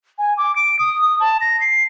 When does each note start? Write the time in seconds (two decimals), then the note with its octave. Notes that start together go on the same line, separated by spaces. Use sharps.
0.18 G#5
0.37 D6
0.56 D7
0.79 D#6
1.02 D#6
1.20 A5
1.41 A#6
1.61 C7